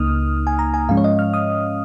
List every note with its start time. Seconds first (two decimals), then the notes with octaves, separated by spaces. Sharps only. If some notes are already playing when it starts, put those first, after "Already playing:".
Already playing: C#2 C#3 A#3 D#4 D#6 F6
0.47 G#5
0.59 A#5
0.74 G#5
0.89 G#2 F3 G#3 C#4 F5
0.97 C#5
1.04 D#5
1.19 F6
1.34 D#6